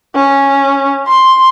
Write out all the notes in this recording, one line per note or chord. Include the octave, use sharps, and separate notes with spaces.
C#4
C6